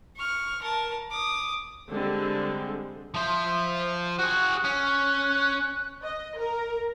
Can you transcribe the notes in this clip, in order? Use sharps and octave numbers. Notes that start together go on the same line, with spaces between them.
C#6 F6
A#4 A5
D6 D#6
D3 G3 G#3 C4
F3 C5 E5
F#4 G#4 F#6
C#4 F#6
D#5
A#4